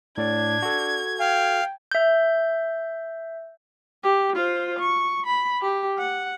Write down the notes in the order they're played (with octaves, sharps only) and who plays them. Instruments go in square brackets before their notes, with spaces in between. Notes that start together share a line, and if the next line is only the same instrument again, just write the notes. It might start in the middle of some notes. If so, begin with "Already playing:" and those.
[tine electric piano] A2 D5 [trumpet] D4 [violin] G#6
[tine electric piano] F#4 A4
[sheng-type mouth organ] F5 [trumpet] G5
[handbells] E5 G6
[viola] G4
F4 C5
C#6
B5
G4
F#5